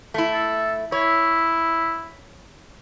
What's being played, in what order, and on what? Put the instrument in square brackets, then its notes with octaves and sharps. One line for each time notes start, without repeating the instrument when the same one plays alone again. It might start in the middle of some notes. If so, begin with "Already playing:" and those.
[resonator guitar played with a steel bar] A3 E4
[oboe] A4
[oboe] E4 [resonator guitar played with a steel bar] C#5